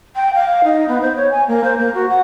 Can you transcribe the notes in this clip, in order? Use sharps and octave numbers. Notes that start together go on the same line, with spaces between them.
G5
F5
D#4
B3
C5
C#5
G#5
A#3
C5
A#3
F#4
F#5